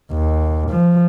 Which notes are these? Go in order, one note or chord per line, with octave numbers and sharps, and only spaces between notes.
D#2
F3